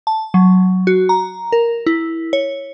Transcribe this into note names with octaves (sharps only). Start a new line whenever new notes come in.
A5
F#3
F#4
A#5
A#4
E4
C#5